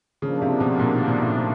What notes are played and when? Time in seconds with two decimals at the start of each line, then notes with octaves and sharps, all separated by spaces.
0.22 C#3 F3 A#3 D4
0.42 C3
0.60 B2
0.79 A#2
0.93 D#3
1.08 A#2
1.22 A2